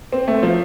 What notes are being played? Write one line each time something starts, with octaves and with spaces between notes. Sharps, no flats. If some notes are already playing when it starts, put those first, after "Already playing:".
C4
A3
F3